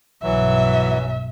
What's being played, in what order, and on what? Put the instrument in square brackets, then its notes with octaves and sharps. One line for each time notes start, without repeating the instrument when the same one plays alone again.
[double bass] B1 G2 [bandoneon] E3 F#3 [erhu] E5